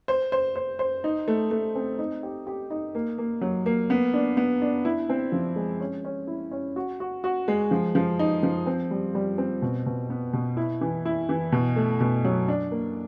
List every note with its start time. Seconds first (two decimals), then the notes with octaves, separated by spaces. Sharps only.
0.08 C5
0.32 C5
0.56 C5
0.79 C5
1.04 D#4
1.28 A3
1.51 A3
1.76 C4
1.99 D#4
2.23 G4
2.47 G4
2.71 D#4
2.95 A#3
3.18 A#3
3.41 F#3
3.66 A#3
3.90 B3
4.14 D4
4.37 B3
4.62 D4
4.85 E4
5.09 C4
5.32 F3
5.56 G#3
5.80 C#4
6.05 C#4
6.27 E4
6.51 C#4
6.76 F#4
7.00 F#4
7.24 F#4
7.48 G#3
7.71 F3
7.95 F3
8.19 D#4
8.43 F3
8.67 C4
8.91 G3
9.15 G3
9.38 C4
9.62 B2
9.86 B2
10.10 B3
10.33 B2
10.57 E4
10.81 E3
11.06 E4
11.29 E3
11.52 B2
11.76 A3
12.00 B2
12.24 F#3
12.48 D4
12.71 A#3